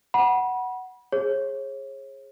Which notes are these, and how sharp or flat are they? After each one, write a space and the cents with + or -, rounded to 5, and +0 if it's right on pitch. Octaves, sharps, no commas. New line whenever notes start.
F#5 +5 B5 -30
G#4 +0 C#5 -40